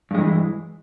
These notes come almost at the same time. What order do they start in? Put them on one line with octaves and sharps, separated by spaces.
G2 G#3 E3